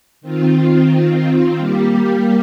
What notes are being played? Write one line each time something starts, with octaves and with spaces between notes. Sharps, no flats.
D#3 C4 F4
G3 A#3 G4